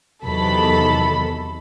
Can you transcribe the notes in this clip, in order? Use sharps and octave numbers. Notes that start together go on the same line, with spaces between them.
E2 C3 D#3 F#3 A4 B5